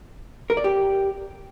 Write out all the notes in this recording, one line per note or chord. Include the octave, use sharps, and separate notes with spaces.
A#4
D5
G4